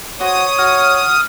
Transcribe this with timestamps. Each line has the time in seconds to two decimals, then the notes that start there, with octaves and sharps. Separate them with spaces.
0.20 F#4 C5 C#5 F#5 D#6
0.58 F#4 E5 F6